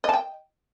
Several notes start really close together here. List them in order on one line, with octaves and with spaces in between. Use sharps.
D#5 A5 G5